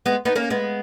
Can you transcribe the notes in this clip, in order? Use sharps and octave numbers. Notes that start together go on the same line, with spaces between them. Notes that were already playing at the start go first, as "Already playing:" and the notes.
G#3 B3
B3 D#4
A#3 C#4
G#3 B3